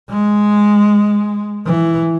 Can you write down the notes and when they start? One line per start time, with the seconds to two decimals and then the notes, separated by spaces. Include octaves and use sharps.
0.10 G#3
1.66 E3